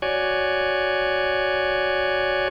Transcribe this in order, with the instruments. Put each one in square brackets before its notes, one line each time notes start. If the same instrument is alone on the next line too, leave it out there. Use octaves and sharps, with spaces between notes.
[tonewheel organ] F#4 C#5 D5 G#5